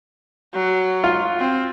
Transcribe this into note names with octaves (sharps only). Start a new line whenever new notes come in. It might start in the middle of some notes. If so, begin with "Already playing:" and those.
F#3
F4
C4